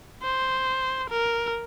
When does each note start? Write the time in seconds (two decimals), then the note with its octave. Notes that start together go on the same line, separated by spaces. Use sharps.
0.23 C5
1.10 A#4